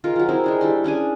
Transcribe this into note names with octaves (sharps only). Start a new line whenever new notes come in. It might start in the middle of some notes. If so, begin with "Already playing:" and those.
G#3 F4 A#4
F3 F#3
C4 E4 G#4 A#4
G#3 D4 G#4
G3 E4 C6
C#4 D4 G#4 G#5